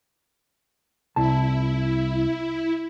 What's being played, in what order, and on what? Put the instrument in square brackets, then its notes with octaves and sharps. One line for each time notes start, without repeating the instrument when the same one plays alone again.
[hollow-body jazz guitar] C2 A5 [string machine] E4